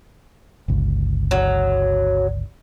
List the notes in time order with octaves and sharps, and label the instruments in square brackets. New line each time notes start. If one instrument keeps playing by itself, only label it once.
[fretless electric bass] G1 C#2
[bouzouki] F#3